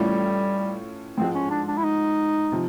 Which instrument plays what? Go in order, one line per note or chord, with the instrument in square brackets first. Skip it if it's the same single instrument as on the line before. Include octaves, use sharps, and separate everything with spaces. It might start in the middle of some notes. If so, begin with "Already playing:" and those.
Already playing: [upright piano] A2 E3 A3 C#4 F4 [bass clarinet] G3
[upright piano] G#2 F3 G#3 [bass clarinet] C4
[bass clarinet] C#4
D4
D4
E4
D#4
[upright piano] C3 F3